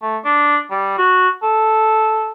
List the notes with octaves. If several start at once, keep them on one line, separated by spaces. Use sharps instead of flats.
A3
D4
G3
F#4
A4